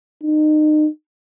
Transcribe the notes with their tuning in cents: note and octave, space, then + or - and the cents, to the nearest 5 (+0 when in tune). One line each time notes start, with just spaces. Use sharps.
D#4 -30